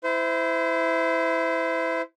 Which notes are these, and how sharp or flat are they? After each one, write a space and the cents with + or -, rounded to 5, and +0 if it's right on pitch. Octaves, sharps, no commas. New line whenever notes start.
E4 +0 C5 -30